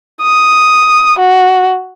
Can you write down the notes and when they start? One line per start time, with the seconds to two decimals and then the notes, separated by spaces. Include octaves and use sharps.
0.22 D#6
1.18 F#4